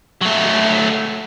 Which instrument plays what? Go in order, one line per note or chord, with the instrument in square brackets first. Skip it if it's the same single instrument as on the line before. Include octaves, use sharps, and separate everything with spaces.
[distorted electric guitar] F#3 A3